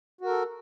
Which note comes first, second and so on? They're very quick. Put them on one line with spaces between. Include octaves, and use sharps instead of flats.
F#4 A#4 A4